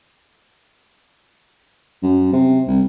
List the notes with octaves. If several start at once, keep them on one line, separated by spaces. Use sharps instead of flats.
F#2
C3
C2